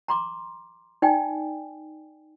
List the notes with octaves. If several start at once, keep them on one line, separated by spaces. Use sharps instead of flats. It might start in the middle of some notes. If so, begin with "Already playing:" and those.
A#5 C6 D6
D#4 D5 G5 G#5